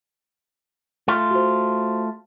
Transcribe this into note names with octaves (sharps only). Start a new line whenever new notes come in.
A3 F4
F#4 C5